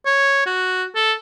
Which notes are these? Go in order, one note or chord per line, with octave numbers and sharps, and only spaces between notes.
C#5
F#4
A4